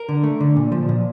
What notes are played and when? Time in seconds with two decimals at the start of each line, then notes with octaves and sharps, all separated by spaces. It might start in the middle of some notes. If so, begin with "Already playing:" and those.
Already playing: A#4
0.09 D3
0.24 A3
0.40 D3
0.56 A#2
0.72 F3
0.89 A#2